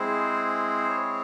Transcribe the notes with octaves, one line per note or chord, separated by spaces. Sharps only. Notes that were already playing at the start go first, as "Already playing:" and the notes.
Already playing: G#3 C4 E4 G#4 C5
C#5